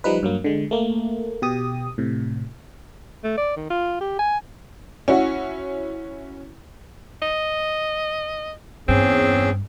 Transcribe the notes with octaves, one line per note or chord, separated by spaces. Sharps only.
F3 G3 D#4 B4
G2 F#3 A#3
D3 G#3
A3 A#3
B2 G4 D#6
A2 C3
A3
D5
D#3
F4
G4
G#5
C#4 E4 F#4
D#5
E2 G2 C4 C#4 G#4